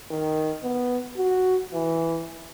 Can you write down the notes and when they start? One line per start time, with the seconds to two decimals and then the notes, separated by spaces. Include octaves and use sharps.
0.11 D#3
0.63 B3
1.17 F#4
1.74 E3